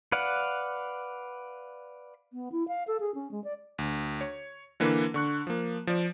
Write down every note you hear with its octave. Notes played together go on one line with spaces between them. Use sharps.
B4 D5 F5 F#5
B3
E4
F5
A4
G#4
C#4
G#3
D5
D2
C#5
D3 E3 A#3 B4
D3 C#6 F#6
F3 A#3
F3 D5